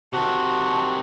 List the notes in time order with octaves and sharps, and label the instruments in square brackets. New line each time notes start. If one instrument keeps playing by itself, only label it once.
[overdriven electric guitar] C3 D#3 [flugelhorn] F#4 [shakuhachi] A5